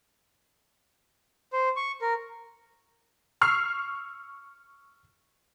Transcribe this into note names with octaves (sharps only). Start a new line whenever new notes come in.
C5
C#6
A#4
C#6 E6 F6 C7